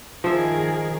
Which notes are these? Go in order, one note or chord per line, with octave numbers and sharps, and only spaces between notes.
D#3 F3 G#4 A#4 E5